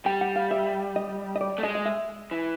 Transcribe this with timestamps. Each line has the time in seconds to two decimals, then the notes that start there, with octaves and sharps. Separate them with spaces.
0.06 G3 G5
0.21 F#5
0.36 F5
0.51 E5
0.96 D#5
1.36 D#5
1.41 D5
1.58 A3
1.63 G#3 D#5
1.75 D#5
1.86 E5
2.31 E3